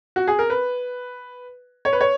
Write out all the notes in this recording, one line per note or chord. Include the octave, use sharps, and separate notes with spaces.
F#4
G#4
A#4
B4
C#5
B4
C#5